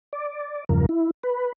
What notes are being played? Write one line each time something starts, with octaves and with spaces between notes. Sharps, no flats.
D5
E2 G2 C#3 F3 A#4
E4
B4